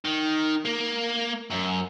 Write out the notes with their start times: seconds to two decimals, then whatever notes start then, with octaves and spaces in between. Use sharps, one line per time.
0.05 D#3
0.65 A#3
1.51 F#2